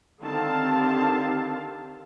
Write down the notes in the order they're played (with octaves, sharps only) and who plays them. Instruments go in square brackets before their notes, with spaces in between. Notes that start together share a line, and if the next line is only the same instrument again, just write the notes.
[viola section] D3 D#3 C4 G4 F5 A5